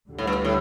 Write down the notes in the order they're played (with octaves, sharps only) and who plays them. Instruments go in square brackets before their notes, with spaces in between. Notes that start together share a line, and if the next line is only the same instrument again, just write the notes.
[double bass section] D2 D3 G3
[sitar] A2
G2
A2